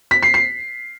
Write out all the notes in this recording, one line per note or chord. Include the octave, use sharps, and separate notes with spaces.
B6
C7
C7